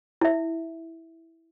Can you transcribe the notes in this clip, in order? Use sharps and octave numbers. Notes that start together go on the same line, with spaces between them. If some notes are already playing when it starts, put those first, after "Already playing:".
E4 E5